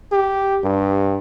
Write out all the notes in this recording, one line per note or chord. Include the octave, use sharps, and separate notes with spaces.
G4
G2